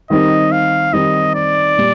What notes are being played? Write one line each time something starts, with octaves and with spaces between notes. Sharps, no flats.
D#3 G3 C4 D#4 D#5
F5
D#3 G3 C4 D#4 D#5
D5
A#2 G3